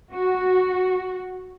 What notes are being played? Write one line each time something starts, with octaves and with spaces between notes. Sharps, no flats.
F#4